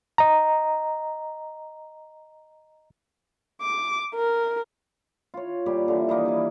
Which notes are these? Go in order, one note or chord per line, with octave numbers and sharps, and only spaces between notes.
D#5 A#5
D6
A#4
F4 C#5
A#2 G3 G4
D3 E3
D#3 E3 A#3 D#4
G3 G#5 D6